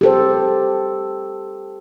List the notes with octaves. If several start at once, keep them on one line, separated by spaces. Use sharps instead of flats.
G4 A4 C5